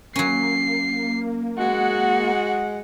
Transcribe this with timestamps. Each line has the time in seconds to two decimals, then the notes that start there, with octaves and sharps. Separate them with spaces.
0.16 F#3 A#3 C#4 C7
1.58 G#3 F#4 F#5